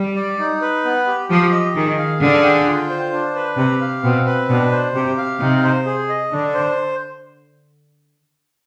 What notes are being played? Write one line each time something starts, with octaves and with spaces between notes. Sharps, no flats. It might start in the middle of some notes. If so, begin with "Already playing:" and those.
Already playing: G3
D5
D#4
B4
B3
G4
F3 G4
D#5
D#3 G#4
F5
D3 G#4
G5
F4
C5
D4
B4
C3 G4
F5
B2 C4
B4
B2 D4
C5
C3 G4
F5
C3 D#4
C5
G#4
D#5
D3 D4
C5